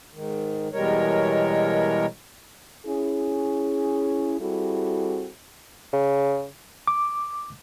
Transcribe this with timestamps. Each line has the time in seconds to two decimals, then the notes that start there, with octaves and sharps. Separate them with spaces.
0.13 G#2 D#3
0.73 E2 B2 G3 G#3 A#4 C#5
2.86 C#4 E4 G#4
4.41 G3 C4 E4 F#4 G#4 A4
5.93 C#3
6.87 D6